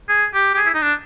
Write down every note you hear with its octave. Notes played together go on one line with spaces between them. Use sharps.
G#4
G4
G4
G#4
E4
D#4
D4